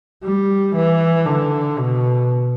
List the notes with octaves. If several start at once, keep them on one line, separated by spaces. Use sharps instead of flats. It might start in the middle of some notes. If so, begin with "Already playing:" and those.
G3
E3
D3
B2